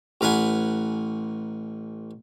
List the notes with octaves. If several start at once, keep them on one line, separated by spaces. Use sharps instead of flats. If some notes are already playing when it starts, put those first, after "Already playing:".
A1 A#4 B4 F#5 G#5